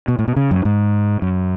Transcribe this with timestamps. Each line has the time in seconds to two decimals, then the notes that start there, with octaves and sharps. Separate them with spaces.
0.08 B2
0.19 A2
0.28 B2
0.36 C#3
0.51 F#2
0.65 G#2
1.22 F#2